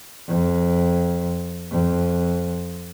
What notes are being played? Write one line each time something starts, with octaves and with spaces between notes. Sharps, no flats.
F2
F2